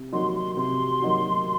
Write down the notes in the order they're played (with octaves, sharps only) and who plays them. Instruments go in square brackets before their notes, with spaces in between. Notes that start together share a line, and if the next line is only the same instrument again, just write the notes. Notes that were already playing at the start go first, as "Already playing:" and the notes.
Already playing: [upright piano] C3
[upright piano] F#3 A#3 D#4 F#4 [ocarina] C6
[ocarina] C6
[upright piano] C3 [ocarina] C6
[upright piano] F#3 A#3 D#4 F#4